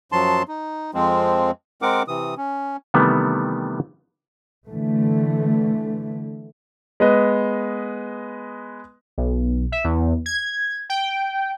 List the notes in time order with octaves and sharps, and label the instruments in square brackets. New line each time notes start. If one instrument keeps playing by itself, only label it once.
[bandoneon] F#2 F3 F#3 A5 C6
D#4
F2 F3 G#3 C4
G#3 C4 A#4 F#5 D6
C3 E3 D#6
C#4
[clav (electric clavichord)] C3 D#3 E3 G3 A3 B3
[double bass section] D3 E3 A3
[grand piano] G#3 B3 B4 D#5
[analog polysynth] B1
E5
E2
G#6
G5